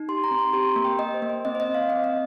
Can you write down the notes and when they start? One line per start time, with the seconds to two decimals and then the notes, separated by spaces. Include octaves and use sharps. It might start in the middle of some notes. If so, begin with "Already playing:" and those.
Already playing: D#4
0.08 G4 C6
0.24 A#5
0.31 C4
0.39 C6
0.53 G4 C6
0.68 A#5
0.76 A#3
0.84 G5
0.99 A#3 D#5
1.14 C5
1.22 A#3
1.30 C5
1.45 C4 D#5
1.55 C5
1.60 D#5
1.67 C4
1.74 F5
1.89 C4 D#5
2.04 D#5